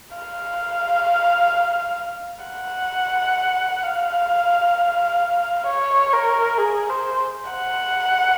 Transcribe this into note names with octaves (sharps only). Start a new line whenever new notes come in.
F5
F#5
F5
C#5
A#4
G#4
C5
F#5